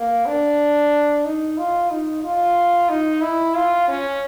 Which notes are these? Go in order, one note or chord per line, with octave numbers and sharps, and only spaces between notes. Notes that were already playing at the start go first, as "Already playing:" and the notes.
Already playing: A#3
D4
D#4
F4
D#4
F4
D#4
E4
F4
C#4